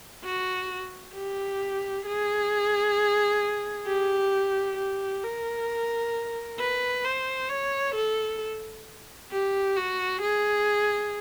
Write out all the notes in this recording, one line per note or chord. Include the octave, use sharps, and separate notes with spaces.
F#4
G4
G#4
G4
G4
A#4
B4
C5
C#5
A4
G4
F#4
G#4